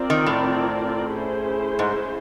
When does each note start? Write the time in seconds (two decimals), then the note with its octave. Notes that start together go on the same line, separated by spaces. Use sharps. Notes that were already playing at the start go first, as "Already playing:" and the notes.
Already playing: C4 F4 A#4 D5
0.10 D#3
0.26 A2
1.11 C#4 E4 G#4 C5
1.79 G#2